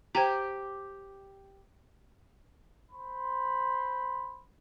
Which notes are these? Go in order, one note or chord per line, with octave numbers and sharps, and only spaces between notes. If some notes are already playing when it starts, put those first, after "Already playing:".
G4 C5 G5 A#5
C5 B5 C6